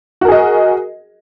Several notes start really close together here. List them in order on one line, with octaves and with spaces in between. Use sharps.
F#4 A#4 G#4 D#5